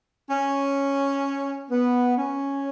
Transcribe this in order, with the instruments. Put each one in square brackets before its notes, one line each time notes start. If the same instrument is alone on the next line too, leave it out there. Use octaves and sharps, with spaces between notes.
[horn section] C#4
B3
C#4